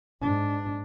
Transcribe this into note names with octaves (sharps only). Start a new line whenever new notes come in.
G#2 D4